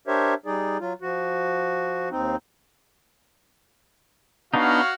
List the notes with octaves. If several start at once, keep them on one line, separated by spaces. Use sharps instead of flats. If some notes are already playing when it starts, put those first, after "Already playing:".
D4 G4 A#4 C5 C#5 E5
G3 D#4 G#4 D5
F#3 F4
F3 F#4
D#2 C4 D#4
B3 D4 D#4 F#4 C#5 F5